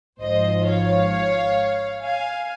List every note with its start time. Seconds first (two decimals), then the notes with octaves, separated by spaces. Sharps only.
0.21 G#1 G#2 F3 C5 D#5
0.66 C#5 F5
2.02 F5 G#5